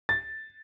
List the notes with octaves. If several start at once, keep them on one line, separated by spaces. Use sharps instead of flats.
A6